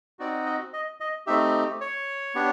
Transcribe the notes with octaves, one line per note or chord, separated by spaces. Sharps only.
C4 D#4 F#4 D5
D#5
D#5
D#5
A3 C4 D#4 G4 E5
C#5
B3 D4 G4